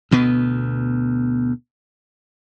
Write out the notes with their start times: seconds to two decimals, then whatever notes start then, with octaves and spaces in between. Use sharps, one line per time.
0.11 D2 B2 B3